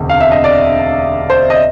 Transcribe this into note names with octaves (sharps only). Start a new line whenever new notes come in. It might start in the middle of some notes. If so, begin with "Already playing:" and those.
Already playing: E1 D2 C3
F5
E5
D#5
D5
C5
D#5